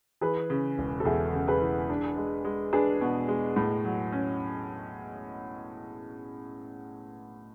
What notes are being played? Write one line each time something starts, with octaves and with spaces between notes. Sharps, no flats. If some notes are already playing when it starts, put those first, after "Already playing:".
E3 G#4 B4
C#3
E1
A4
E2 E4 G#4
C#3
G#4 B4
E3
D4
G#3
G#3
D4 G#4 B4
B2
G#3
A2
F#3
C#4